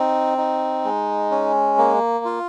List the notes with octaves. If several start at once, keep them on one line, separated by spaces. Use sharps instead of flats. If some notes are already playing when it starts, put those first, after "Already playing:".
Already playing: C4 D#4
D#4
G#3
C#4
A#3
F4